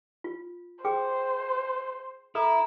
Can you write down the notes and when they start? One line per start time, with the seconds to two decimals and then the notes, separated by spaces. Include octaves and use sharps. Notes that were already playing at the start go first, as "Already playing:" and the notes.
0.24 F4
0.85 G#4 C5 G5 D6
2.35 E4 A4 A#5 D#6